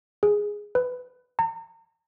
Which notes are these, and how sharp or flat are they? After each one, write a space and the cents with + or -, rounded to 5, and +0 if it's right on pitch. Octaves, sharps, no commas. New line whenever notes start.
G#4 -5
B4 +15
A#5 -40